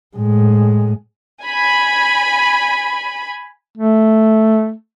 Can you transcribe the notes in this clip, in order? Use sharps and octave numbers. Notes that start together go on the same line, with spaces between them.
A2 G#3
G#5 B5
A3